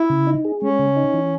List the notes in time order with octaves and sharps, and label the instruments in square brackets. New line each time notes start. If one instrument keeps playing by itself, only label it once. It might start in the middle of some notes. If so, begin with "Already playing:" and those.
Already playing: [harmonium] E4
[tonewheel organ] C#3
D#4
G#4
[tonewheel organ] G#3 [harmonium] C#4
[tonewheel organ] C#3
D#4
E3